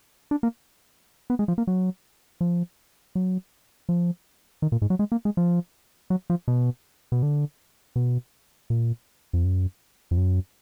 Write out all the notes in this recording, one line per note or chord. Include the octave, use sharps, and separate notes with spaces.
D4
A#3
B3
G#3
F3
A#3
F#3
F3
F#3
F3
D#3
A#2
G#2
F#3
G#3
A#3
G#3
F3
F#3
F3
B2
B2
D3
B2
A#2
F2
F#2
F2
F#2